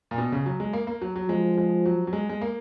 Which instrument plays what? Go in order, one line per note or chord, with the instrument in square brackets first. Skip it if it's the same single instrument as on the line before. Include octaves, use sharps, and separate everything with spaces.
[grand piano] A#2
B2
C#3
F#3
G#3
A#3
A#3
F#3
F#3
[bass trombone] F3 [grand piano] G#3
[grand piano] G#3
F#3
F#3
G#3
G#3
A#3